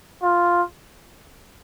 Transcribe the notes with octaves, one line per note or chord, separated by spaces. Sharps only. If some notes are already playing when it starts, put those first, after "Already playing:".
F4